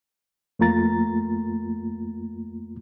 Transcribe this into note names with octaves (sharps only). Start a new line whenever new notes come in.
F2 A3 A#3 F4 A#5 A6